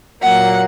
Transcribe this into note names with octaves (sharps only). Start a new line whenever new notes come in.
A#2 F#3 A#3 F#5